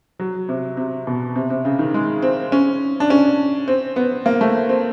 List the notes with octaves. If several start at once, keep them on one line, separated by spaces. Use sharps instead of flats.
F#3
C3
C3
B2
C3
C3
C#3
D#3
G#3
C4
C#4
D4
C#4
C4
B3
A#3
A3
C4